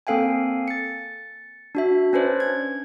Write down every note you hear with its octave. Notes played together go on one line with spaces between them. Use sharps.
A#3 C4 A4 F5 G5 G#5
A6 C#7
D4 F#4 E5
C#4 D4 B4 C5 D5
G#6